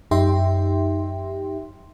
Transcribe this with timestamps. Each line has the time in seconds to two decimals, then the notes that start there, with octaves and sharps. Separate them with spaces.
0.11 F#2 D#4 G4 E5 G5 C6